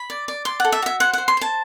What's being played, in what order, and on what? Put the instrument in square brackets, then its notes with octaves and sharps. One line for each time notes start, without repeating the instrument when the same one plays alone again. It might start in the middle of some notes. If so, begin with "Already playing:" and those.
Already playing: [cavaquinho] B5
D5
D5
D5 C6
F#5
A4
E5
F#4 E5
C5 F#5
C5 F#5
C6
C5 A5